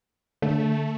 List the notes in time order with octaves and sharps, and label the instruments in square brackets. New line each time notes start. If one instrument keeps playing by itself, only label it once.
[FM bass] D3 [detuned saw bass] A3